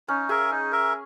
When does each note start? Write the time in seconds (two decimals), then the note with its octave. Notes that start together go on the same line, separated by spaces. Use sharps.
0.08 C#4 D#4
0.29 G#4 A#4 E5
0.51 D#4
0.72 A#4 E5